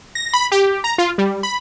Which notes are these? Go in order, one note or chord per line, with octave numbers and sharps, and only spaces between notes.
A#6
B5
G4
A#5
F4
G3
B5